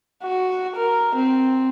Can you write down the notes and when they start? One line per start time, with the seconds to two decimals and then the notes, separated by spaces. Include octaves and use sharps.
0.23 F#4
0.76 A#4
1.16 C4